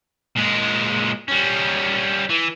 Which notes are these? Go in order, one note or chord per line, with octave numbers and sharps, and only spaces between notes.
A#2 G#3
G3 C#4
E3